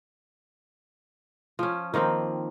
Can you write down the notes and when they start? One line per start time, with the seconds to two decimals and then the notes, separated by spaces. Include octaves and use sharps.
1.59 F3 C#4
1.94 D#3 F3 A#3 C4